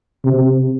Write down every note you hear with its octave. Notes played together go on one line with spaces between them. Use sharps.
C3